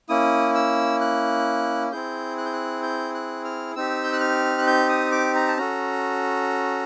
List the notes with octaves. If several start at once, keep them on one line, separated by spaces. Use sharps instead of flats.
A#3 C#4 E4 D#6
E6
F#6
C4 E4 G#4 G6
F#6
G6
F#6
G6
F#6
F6
C4 D#4 G4 E6
G6
F#6
F6
F#6
G6
D#6
D6
A#5
A5
C#4 F#4 A4 A#5